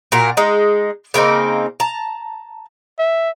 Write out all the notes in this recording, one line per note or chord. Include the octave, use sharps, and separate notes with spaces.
A#2 F#4 A#4
G#3 D#4
C#3 A#3 C4 D#4
A5 A#5
E5